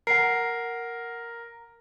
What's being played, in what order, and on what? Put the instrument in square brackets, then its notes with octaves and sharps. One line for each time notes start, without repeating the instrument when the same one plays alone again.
[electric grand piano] A#4 [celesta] F#5 C7